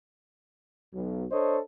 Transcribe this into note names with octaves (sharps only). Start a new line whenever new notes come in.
B1
D4 A4 C5 C#5 D#5